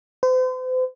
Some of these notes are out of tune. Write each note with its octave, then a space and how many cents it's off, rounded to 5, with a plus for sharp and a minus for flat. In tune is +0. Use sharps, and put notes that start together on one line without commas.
C5 -40